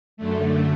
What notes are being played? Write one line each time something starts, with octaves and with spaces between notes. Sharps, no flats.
F#2 D3 A3